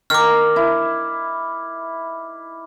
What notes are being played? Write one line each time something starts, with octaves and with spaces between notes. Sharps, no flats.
D#3 D6 F6
E4